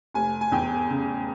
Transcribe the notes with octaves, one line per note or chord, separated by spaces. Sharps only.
F1 G#5
G#5
E2 G5
C#3